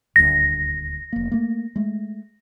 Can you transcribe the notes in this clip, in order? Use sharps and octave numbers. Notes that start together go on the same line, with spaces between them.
D#1 D2 A#6
F1 A#3
A3 A#3
G#3 A3